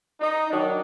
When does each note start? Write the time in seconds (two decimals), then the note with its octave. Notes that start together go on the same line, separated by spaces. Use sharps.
0.21 D#4
0.50 D#3 F#3 D4